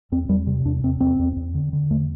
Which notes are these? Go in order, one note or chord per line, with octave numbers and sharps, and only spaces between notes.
E2 C4
E2 G3
C3
E2 D4
E2 C4
E2 C4
E2
E2
D3
D3
E2 A3